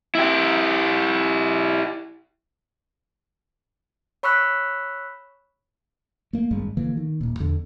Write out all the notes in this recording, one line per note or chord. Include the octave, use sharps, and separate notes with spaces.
E4 G4
C#5 B5 C#6 E6 F#6 B6
A3 A#3
G#1 G2 G3 G#3
D3 E3 A#3
D#3
D#1 A#2
E2 D3